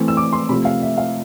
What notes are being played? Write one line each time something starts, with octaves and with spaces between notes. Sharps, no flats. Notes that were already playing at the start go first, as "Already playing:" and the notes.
Already playing: E3 A3 C4
E6
D6
C6
C3 F3 A3 B5
F5
E5
F5